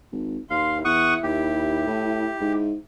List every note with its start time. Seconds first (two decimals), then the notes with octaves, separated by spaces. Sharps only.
0.12 G#1
0.50 D#2 F5 C6
0.85 E2 E4 F#5 C#6 D#6
1.23 D#2 G4
1.86 A2
2.41 G#2